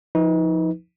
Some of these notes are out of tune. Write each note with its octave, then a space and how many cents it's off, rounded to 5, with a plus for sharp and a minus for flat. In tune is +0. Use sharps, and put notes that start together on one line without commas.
F3 +0 D#4 +35 B4 +0